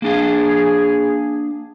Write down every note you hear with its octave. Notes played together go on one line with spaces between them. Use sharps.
A#3 D4 G#4 F5